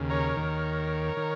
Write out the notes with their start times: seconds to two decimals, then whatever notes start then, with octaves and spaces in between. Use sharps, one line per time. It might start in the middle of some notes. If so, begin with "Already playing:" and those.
Already playing: D#2 C#3
0.10 A#4 C#5
0.36 D#2 D#3
1.17 D#3